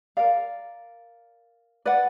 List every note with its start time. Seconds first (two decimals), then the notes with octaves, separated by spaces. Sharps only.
0.17 A#4 D5 F5
1.85 B4 D5 F#5